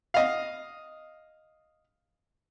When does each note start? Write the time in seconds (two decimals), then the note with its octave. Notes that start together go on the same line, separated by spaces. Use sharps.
0.14 D#5 F5